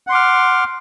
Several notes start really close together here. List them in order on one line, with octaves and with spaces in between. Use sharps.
F#5 C6 D6 F6